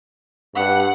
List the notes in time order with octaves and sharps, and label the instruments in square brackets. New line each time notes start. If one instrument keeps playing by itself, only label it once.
[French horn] G2 [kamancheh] F#5